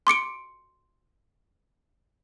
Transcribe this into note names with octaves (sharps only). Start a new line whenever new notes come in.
C6 D6 C#7 D7